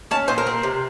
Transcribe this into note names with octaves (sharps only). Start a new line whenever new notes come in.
C#4 A5
A#2 C5
A#4
C4
C3